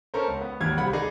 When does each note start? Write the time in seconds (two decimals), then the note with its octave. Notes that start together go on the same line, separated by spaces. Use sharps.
0.14 C#4 A4 A#4 C5
0.28 C#2
0.41 B3
0.60 G#1 D#2 G#6
0.78 C2 C3 F#5 B5
0.93 D#4 G#4 D5 D#5